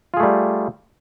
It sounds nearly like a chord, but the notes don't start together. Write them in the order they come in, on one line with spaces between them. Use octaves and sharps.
F4 G#4 A3 G3